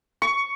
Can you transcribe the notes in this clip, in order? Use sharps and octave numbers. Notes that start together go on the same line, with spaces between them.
C#6